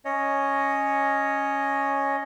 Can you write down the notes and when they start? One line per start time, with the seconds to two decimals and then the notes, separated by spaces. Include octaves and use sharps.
0.05 C#4 C#5 D#5